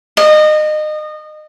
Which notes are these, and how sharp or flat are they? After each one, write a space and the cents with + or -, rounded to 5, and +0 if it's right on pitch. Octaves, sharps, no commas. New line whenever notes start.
D#5 -25